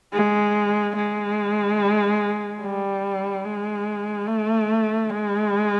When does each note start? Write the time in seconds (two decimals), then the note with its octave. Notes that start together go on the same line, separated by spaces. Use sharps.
0.13 G#3
0.96 G#3
2.62 G3
3.44 G#3
4.27 A3
5.10 G#3